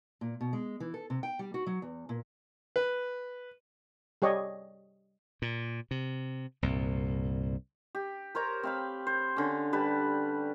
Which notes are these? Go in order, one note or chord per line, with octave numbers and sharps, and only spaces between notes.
A#2
B2
G#3
E3
A4
C3
G5
G3
F#4
F#3
E2
A#2
B4
G3 G4 C#5 D#5
A#2
C3
C2 G2 A#2
G4
A#4 C5 C#5 A#5
C4 F5 B5
C5
D3 C#4
G3 B4 A5